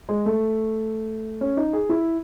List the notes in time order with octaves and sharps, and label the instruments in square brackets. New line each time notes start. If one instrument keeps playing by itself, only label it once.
[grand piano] G#3
A3
C#4
D#4
G#4
E4